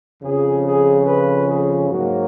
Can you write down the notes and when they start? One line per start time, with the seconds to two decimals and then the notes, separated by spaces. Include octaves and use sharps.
0.21 F2 C#3 F3 G#4
0.63 G#4
1.05 B4
1.46 G#4
1.88 G#2 F#3 A#3 F#4